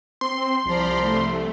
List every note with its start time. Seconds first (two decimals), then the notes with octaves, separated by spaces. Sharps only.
0.21 C4 C6
0.65 C2 F3 D5 A#5 B5
1.01 A3